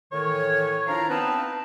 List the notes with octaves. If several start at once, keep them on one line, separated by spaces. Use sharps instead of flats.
A2 D#3 E3 C#5
F3 D4 E4 A#4 F5 A#5
B3 C4 D#4 B4 D#5 A5